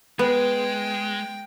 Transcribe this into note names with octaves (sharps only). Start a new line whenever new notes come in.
G#3 B3 G5